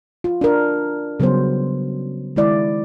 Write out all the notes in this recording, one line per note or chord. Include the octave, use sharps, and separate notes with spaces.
F4
D4 A#4
C#3 F#3 G3 B3 C5
D#3 G#3 E4 D5